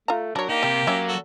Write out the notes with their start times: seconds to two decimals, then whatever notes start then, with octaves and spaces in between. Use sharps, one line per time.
0.08 A3 F4 A#5
0.36 F#3 D4 A#4 C#5
0.49 A#3 D#4 G4
0.63 C3 G3
0.87 F#3 C#4 C#5 E5
1.08 F#4 A4